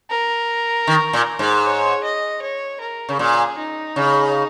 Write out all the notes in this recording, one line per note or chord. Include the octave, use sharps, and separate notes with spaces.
A#4
D#3
A#2
G#2
C#5
D#5
C#5
A#4
C#3
A#2 G#4
D#4
C#3